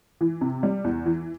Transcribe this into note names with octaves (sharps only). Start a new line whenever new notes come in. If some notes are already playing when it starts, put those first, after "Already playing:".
E3
C3
G3
E2
E3